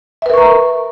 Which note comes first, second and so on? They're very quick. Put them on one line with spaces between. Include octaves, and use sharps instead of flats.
E5 B4 A#4 C#6 A#5